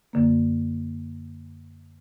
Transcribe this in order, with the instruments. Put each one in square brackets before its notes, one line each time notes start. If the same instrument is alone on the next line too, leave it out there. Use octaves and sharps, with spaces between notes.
[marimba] F#2 D3 A#3